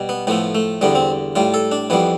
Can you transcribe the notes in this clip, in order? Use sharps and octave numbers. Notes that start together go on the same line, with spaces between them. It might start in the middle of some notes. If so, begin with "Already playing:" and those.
Already playing: B2 G3
B3
A2 F3 A3 B3
A3
E2 D3 G3 B3
C4
A2 G3 F4
A4
D4
F2 E3 G3 B3